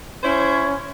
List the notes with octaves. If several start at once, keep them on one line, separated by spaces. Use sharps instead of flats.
C#4 E4 C5 C#5